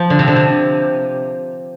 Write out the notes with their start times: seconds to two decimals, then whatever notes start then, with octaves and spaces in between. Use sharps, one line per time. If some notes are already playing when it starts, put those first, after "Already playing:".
Already playing: F3
0.10 D3
0.19 C3
0.28 D3
0.36 C3